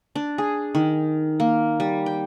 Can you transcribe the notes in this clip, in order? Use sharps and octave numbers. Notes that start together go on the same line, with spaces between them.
D4
G#4
D#3
A#3
G3
G5